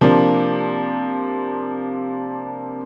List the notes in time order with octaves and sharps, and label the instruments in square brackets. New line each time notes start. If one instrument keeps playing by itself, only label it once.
[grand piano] C3 F3 A#3 D4